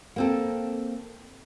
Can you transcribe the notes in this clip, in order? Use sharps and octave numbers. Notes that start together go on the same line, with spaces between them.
A#3 C4 A4